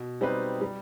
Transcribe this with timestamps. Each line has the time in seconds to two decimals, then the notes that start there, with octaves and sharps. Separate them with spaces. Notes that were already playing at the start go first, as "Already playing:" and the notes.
Already playing: B2
0.21 G3 C4 D#4 B4
0.61 G3